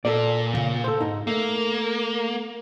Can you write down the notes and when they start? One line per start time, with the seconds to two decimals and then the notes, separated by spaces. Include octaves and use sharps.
0.05 A#2 A4 A#4 D5
0.54 D#2 C#3
0.84 A4 C5
1.00 G#2 D#4
1.27 A3 A#3